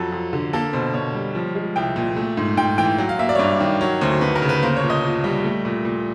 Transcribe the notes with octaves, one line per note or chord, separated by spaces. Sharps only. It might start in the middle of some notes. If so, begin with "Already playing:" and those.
Already playing: F2 F#3 A4
F2
D3
A#3 A4
B2 C5
B2 C#5
G3
F3
G#3
C2 G5
A#2
A3
G#2
G#2 G5
E3 G5
F#3
F5
A#3 E5
D5
C#5
G2 D5
D#3
F#3 C#5
D2 C5
D2 B4
A#4
C#3
B4
A#3 C5
C#5
A#2
D#5
A#2
G3
A3
A#2
A#2